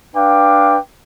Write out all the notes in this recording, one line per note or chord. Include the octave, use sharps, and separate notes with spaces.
D4 B4 F5 G5 D6